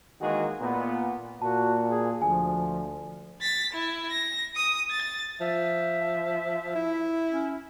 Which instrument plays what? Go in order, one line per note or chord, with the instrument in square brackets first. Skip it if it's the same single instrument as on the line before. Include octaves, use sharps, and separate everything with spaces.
[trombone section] D#3 E3 G#3 A#3 F#4 G#4
A#2 B3
[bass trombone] A#2 [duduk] F#4 [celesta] A5
[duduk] G#4
[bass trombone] D2 [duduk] F3 [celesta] G#5
[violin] A6 B6
E4
A#6
D#6
A6
[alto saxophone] F3 [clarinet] E5
[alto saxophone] E4
[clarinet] C#4